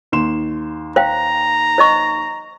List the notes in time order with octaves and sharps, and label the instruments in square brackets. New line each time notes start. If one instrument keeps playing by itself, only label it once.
[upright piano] D#2 C6 E7
[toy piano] C5 F5 G5 [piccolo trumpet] A#5
[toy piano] C5 D#5 C#6